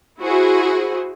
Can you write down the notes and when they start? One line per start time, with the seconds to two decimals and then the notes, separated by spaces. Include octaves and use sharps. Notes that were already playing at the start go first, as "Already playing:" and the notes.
0.20 E4 F#4 G#4 C5